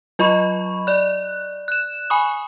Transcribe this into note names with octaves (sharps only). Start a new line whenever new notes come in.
F#3 F4 D#5 B5 C#6
D5 F#6
F#6 E7
G#5 B5 C#6 D#6